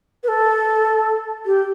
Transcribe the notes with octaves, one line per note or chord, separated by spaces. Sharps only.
B4
A4
G4